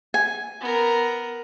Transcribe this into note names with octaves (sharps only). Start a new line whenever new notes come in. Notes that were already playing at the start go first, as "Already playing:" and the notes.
G#5
B3 A#4